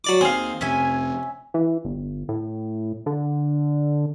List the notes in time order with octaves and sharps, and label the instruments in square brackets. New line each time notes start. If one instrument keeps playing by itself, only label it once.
[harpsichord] F#3 D5 D6
[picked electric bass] D#2 [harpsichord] C4 [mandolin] G#4 F5
[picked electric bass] F2 C3 [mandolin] C#4 E5 G#5
[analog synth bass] E3
G1
A2
D3